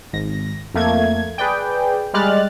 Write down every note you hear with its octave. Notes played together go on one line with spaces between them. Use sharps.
G#1 A#6
F2 A3 A#3 G#6
G#4 B4 D5 G5
G3 G#3 G4 F6 F#6 A6